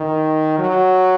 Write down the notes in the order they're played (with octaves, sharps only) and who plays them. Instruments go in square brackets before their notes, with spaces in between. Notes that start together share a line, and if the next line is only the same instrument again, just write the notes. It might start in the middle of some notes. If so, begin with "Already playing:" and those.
Already playing: [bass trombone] D#3
F#3